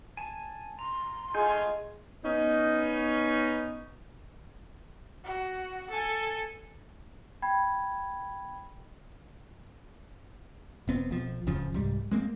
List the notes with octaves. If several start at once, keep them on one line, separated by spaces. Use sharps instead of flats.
G#5 A5
A#5 C6
G#3 A3 D#4 F4 G#5 G6
B3 C#4 D#4
F#4
A4 G#5
G5 B5 G#6
E1 B3 C4
B1 F3
D1 F2 C#3 F3
C2 G#2 G3
G#3 A#3 C4